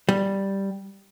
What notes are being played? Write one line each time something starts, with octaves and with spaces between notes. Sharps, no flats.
G3